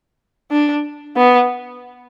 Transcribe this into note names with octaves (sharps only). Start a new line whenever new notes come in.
D4
B3